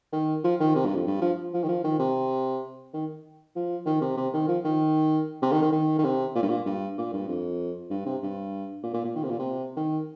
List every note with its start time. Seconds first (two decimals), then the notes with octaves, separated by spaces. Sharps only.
0.13 D#3
0.44 F3
0.60 D#3
0.75 C3
0.85 G2
0.95 F2
1.07 G2
1.21 F3
1.54 F3
1.64 D#3
1.68 F3
1.84 D#3
1.99 C3
2.94 D#3
3.56 F3
3.86 D#3
4.01 C3
4.17 C3
4.34 D#3
4.48 F3
4.65 D#3
5.42 C3
5.52 D#3
5.62 D#3
5.72 D#3
5.99 D#3
6.04 C3
6.35 A#2
6.43 G2
6.49 A#2
6.66 G2
6.98 A#2
7.13 G2
7.28 F2
7.90 G2
8.06 C3
8.22 G2
8.83 A#2
8.94 A#2
9.05 A#2
9.15 D#3
9.24 C3
9.30 A#2
9.39 C3
9.77 D#3